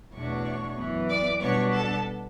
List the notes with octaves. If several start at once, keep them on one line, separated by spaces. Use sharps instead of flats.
E2 B2 A3 D4 C#5 C#6
F#2 E3 B3
D5 D6
B2 G3 B3 D4 C#5 C#6
A4 A5